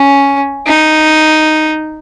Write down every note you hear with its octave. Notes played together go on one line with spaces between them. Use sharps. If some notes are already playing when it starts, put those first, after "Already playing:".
Already playing: C#4
D#4